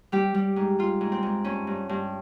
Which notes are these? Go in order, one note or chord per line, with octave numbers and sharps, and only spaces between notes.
G3 G4
G3
G#2
G3 F4
G#2
C4
G#2
G2 C#4
G2
G2